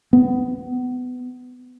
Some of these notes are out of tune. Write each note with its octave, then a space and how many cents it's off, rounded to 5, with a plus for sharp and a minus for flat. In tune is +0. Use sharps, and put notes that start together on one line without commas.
B3 +25